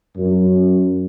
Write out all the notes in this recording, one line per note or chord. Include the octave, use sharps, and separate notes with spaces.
F#2